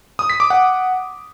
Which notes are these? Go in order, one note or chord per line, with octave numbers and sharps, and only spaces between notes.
D#6
B6
D6
F#5